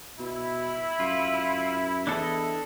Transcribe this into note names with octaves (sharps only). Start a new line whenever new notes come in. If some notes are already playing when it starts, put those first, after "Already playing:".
B2 E4
F#2 F4
E2 D4 A4 D#5